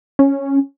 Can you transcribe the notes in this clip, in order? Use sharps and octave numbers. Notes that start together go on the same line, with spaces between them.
C#4